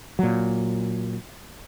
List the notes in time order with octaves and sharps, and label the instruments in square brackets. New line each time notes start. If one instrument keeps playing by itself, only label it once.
[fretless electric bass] A#2 F#3